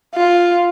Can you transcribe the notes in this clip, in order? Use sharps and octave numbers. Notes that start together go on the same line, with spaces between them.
F4